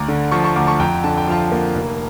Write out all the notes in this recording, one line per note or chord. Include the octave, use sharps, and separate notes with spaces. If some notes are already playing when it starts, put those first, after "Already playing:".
Already playing: D2 A#5 D6
D3
F3 A5 C#6
A5 C#6
D2 A#5 D6
A5 C#6
F2 G5 A#5
D3 A5
G5
F3 F5 A5
A#3
F1